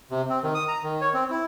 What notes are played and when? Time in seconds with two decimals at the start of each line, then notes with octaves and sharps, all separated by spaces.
0.11 C3
0.29 C4
0.43 D#3
0.55 D#6
0.68 A#5
0.83 D#3
1.01 C#5
1.14 C4
1.31 E4